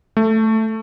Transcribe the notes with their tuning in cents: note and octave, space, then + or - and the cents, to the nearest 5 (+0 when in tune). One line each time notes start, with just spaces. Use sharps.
A3 +5